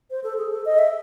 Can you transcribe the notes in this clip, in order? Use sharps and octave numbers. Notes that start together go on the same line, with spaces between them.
C5
A4
G#4
A4
D#5
E5